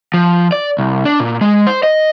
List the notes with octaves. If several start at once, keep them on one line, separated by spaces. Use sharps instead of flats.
F3
D5
C2
D4
A#2
G#3
C5
D#5